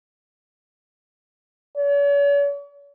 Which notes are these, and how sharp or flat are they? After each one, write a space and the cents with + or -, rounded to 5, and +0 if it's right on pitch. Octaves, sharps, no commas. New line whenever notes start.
C#5 +45